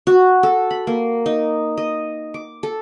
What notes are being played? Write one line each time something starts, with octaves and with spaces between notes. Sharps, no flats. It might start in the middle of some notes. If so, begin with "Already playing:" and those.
F#4
A4
B5
A#3
D#4
D#5
D6
A4